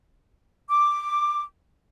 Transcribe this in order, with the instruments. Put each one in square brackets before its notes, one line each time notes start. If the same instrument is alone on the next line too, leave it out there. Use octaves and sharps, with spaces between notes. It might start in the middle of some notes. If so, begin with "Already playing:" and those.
[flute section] D6